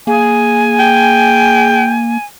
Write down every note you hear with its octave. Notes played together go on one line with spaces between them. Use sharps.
A#3 G#4 G#5
G5